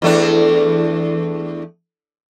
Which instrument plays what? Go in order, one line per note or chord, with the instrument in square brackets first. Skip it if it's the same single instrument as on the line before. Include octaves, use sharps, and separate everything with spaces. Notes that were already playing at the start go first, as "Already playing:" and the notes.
[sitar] E2 A3 D4